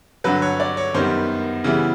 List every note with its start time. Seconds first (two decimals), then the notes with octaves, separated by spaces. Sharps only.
0.24 G2 D3 F#3 B4
0.42 C#5
0.60 D5
0.77 C#5
0.94 F#2 D#3 G3 B3 C5
1.64 C#3 E3 G3 B3 E4